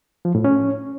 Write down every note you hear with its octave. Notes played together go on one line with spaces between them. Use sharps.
F3
A2
C#4